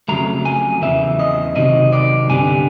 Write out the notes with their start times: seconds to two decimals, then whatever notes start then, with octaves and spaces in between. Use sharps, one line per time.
0.08 F2 C#3 F#3 A3 A#5
0.45 G#5
0.82 E2 C#3 E3 E5
1.19 D#5
1.56 C3 D#3 F#3 C4 D#5
1.93 D5
2.29 G2 D3 G3 B3 D4 G#5